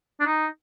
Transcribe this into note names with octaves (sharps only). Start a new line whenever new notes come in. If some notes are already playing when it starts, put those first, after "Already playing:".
D4
D#4